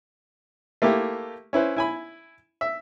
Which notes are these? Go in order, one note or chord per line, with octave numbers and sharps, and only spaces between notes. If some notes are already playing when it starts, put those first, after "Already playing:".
A3 A#3 E4 G4
C#4 E4 B4 C5
E4 G#5 B5
E5